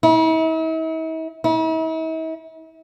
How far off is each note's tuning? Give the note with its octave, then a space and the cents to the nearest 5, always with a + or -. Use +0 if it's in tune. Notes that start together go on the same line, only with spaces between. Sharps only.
E4 -45
E4 -45